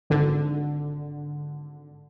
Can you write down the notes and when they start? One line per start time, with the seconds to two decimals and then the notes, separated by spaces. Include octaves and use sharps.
0.10 G#1 D3